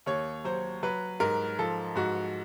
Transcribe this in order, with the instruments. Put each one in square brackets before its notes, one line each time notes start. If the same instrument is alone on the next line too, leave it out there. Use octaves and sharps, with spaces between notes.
[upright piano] D#2 C#5
F#3 C5
F#3 B4
G#2 A#4
F3 A4
G#2 F#4